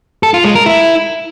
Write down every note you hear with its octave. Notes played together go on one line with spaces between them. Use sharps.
A4
F4
G#3
A#4
E4